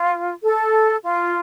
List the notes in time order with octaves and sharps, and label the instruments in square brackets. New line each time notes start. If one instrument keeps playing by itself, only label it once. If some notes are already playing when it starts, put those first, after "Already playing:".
Already playing: [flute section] F4
A4
F4